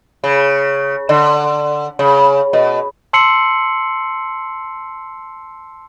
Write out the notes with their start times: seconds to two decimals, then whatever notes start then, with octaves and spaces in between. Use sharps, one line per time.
0.24 C#3
1.09 D3
1.99 C#3
2.53 B2
3.13 A5 C6 E6 C7 C#7 F#7